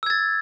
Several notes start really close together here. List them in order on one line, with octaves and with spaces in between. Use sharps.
E6 G#6 A6